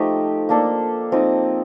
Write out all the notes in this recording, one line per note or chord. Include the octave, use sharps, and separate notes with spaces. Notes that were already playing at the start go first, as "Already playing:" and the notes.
Already playing: F3 A3 D#4 G4 A4
A#3 D4 A4
F3 C4 D#4